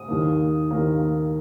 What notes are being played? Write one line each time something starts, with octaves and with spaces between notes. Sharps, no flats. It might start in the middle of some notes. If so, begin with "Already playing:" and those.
Already playing: D#6
D#2 D#3 A#3
D#2 D#3 A#3